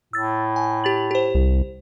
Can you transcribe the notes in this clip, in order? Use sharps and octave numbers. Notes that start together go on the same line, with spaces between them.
A2 E6 A6
G#5
G4 A6 F#7
G4 C5
C2